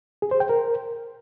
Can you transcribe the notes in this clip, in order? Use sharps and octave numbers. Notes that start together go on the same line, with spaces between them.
G#4
C5
G5
A#4